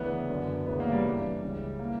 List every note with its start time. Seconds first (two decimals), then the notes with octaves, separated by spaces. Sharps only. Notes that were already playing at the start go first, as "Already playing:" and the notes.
Already playing: D2 C#3 E3 B3
0.28 F#2 D3
0.66 D2 C#3 E3 B3
0.80 A#3
0.92 G3
1.04 G2 E3 G3
1.42 C#2 C#3 E3
1.79 E3 A#3